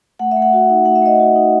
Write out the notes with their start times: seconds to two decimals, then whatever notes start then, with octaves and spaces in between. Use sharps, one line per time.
0.19 A3 F#5
0.31 E5
0.37 A3
0.42 F#5
0.53 F#4
0.69 D#4
0.85 A3 F#5
0.95 E5
1.02 A3 D#5
1.16 F#4 E5
1.36 D#4